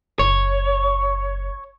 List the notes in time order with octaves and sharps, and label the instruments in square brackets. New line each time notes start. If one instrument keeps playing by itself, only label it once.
[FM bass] F#1 [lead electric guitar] C#5